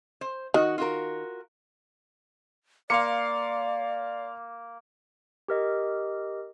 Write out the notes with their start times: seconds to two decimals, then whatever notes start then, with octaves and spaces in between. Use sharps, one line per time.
0.21 C5
0.54 D#3 F#4 D#5 F#5
0.78 F4 F#4 A#4
2.90 A#3 D5 F5 C6 C#7
5.48 G4 A#4 D#5